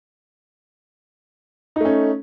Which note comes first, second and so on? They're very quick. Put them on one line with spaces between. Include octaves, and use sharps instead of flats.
D#4 A3 C#4